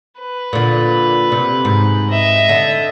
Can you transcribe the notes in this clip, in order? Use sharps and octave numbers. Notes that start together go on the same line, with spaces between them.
B4
A#2 D3
C3
G#2
D#5 E5
D3